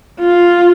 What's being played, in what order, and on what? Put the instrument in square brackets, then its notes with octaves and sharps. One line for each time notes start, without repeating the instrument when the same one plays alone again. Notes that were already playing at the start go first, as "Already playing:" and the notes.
[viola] F4